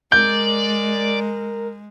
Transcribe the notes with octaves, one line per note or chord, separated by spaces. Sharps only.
G#3 A#4 D5 G6